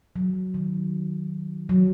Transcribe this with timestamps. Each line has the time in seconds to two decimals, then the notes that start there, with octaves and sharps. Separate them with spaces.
0.16 F#3
0.54 D#3
1.69 F#3